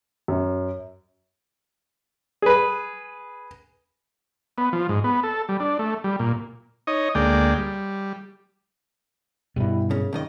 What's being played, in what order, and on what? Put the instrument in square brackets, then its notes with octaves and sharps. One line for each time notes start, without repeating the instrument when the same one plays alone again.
[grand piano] F#2
[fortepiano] G#4 B4
[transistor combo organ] B3
F3
G#2
B3
A4
G3
D4
A3
G3
A#2
D#4 C#5 D#5
D2 G#3 A#3 D5 G5
G3
[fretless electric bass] G2 B2 [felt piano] G3 E4
[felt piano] F#2 [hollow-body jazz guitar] C#3
[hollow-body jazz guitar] C#2 D#3 D#5